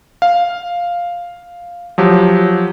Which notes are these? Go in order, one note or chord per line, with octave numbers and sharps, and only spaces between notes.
F5
F3 F#3 G4